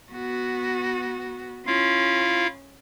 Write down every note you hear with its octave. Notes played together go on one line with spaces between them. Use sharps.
B3 F#4
C#4 E4 F4 F5